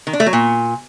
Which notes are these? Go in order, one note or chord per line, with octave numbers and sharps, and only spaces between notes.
D#3
D4
A3
F#3
A#2